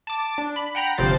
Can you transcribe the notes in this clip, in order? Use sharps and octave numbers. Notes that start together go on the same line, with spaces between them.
A5 D6
D4
B5
F#5 G5 A#5 B5
G1 C3 F3 C5 A6 C7